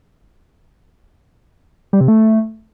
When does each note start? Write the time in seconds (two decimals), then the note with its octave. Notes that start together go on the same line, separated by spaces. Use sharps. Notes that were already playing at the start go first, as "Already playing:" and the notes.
1.93 G3
2.01 C3
2.08 A3